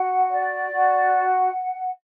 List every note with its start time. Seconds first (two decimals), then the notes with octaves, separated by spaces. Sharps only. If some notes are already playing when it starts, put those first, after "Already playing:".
Already playing: F#4 F#5
0.29 D5
0.70 F#4
1.11 F#5